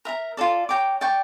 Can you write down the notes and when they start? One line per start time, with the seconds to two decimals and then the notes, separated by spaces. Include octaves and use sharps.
0.05 A#4 E5 A#5
0.37 F4 A4 D5
0.69 C#5 G5 A#5 D6
1.01 D5 G5 C#6